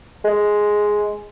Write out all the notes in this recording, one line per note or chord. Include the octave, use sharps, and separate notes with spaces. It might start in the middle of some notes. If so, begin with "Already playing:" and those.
G#3